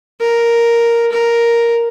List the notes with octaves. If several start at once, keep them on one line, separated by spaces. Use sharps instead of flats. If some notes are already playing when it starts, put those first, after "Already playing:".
A#4
A#4